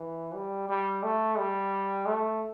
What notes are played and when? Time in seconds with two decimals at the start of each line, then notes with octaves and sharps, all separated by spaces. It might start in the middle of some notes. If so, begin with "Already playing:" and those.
Already playing: E3
0.35 G3
0.69 G3
1.03 A3
1.38 G3
2.06 A3